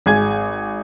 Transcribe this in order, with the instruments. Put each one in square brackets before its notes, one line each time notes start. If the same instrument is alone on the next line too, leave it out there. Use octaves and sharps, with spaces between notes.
[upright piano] G#1 G#4 G#5 G#6